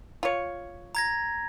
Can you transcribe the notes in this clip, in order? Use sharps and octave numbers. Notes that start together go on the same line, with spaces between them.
F4 C#5
A#5 G#6 A#6